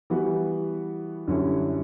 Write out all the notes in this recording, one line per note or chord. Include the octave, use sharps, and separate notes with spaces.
E3 G3 B3 F#4
F#2 D3 G3 C#4 E4